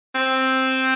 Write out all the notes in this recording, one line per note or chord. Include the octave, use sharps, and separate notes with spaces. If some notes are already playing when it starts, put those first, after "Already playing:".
C4